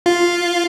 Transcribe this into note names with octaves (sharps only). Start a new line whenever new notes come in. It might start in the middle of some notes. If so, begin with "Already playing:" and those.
F4